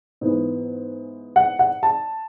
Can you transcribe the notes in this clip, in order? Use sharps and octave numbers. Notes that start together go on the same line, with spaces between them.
G#2 E3 B3
F#5
F#5
A5